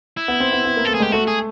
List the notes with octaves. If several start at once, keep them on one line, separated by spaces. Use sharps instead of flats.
E4
B3
C4
B3
B3
A#3
A3 A4
G#4
G#3 G4
A3 F#4
G#4